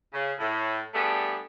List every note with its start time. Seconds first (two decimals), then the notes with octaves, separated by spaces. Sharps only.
0.14 C#3
0.39 A2
0.94 G3 A3 B3 D4 G4 G#4